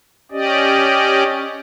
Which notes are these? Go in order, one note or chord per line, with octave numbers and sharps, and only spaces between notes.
C#4 G4 D5 D#5